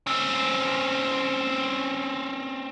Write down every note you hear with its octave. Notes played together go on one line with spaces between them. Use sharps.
C4 C#4